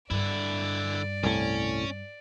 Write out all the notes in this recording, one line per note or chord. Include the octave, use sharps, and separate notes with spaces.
G2 D3 E4 D5
C2 A2 C#4